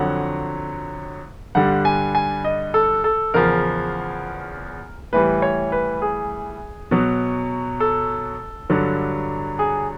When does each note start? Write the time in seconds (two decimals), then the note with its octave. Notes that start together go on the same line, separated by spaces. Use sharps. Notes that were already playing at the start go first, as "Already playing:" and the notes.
Already playing: F2 D3 F#3 F#5
1.55 G2 D3 G3 F#5
1.85 G#5
2.15 G#5
2.44 D#5
2.74 A4
3.04 A4
3.34 E2 C#3 F3 A#4
5.13 A2 E3 G3 B4
5.42 C#5
5.72 B4
6.02 G#4
6.91 B2 F#3
7.80 A4
8.70 G2 D3 F#3
9.59 G#4